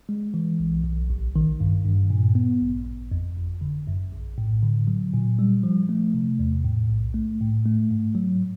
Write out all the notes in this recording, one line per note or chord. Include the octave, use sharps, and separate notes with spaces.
G#3
E3
B1
B1
A1
D#3
G2
G2
A#2
B3
A1
A1
F2
G1
D3
F#2
A#1
A2
D3
F#3
A#2
G3
F3
A3
C3
E2
A2
B1
A3
A2
A3
G#2
F#3